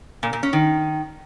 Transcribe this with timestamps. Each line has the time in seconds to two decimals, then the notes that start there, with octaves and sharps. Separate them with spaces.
0.23 A#2
0.33 A#2
0.43 C#4
0.53 D#3